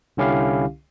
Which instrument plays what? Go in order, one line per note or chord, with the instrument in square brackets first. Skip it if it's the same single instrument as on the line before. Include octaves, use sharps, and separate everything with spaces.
[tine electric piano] C2 D3 C#4 E4 G4 F5